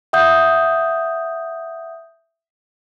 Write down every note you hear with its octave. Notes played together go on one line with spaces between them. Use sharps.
E5 F#5 D#6 G6